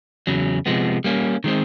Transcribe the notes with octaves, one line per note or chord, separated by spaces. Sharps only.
E2 C#3 F#3
C3 F3 G#3 B3
G3 A#3 C#4
D#3 G#3 C4